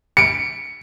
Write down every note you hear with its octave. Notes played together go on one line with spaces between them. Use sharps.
C#7 D7